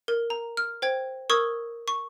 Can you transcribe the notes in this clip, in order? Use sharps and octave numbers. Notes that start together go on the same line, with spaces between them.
A#4
A#5
F6
C5 G5 G#6
A#4 C#6 D#6 E6 G#6
C#6